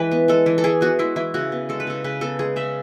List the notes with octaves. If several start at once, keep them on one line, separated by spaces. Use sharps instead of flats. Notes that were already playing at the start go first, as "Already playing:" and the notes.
Already playing: E3 G#3 B4
B3
G#3 A4
E3
A4
E3 G#4
B3 F#4
G#3 E4
E3 E4
C#3 F#4
B3
G#3 A4
B4
C#3 A4
C#3 B4
B3 A4
G#3 G#4
C#3 E5